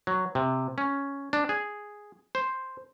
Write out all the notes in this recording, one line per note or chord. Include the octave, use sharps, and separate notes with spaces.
F#3
C3
C#4
D4
G#4
C5